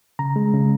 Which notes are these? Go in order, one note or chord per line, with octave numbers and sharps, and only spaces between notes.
C#3 A#5
G#3
C#3